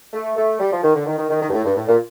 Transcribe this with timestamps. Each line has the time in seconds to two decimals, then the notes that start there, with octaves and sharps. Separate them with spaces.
0.13 A3
0.36 A3
0.60 G3
0.72 F3
0.83 D#3
0.95 D3
1.06 D#3
1.18 D#3
1.30 D#3
1.42 D#3
1.49 G2
1.53 A2
1.65 G2
1.76 A2
1.88 A#2